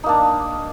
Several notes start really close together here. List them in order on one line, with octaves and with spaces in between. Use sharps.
D#4 A#3 D4